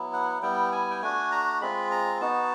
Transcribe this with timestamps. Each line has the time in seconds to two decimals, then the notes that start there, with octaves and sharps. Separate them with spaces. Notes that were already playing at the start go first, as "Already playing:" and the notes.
Already playing: F#3 B3 E4
0.13 F#5
0.42 G3 B3 E4 G5
0.72 G#5
0.91 G5
1.02 A3 D4 F#4 G#5
1.32 A#5
1.61 G#3 C4 F4 B5
1.91 A#5
2.21 B3 D#4 F#4 A5